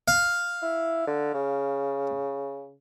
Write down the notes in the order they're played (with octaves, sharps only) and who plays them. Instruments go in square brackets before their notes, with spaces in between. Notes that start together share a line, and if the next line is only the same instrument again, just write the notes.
[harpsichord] F5
[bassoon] E4
D3
C#3